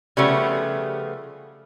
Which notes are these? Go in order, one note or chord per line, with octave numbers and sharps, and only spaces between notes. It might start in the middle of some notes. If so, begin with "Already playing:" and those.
C#3 F3 G3 A3 B3